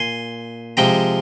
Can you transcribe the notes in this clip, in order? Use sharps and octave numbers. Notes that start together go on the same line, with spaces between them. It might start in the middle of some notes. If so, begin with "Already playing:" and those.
Already playing: A#2 G#5 C6
C3 F3 G#3 G5 A#5